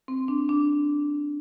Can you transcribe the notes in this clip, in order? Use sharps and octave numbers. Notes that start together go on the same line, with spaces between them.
C4
D4
D4